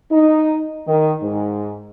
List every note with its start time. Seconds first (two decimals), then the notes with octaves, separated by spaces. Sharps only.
0.12 D#4
0.88 D#3
1.23 G#2